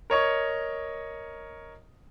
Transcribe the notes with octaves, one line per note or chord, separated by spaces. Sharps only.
A#4 C#5 D#5 C#6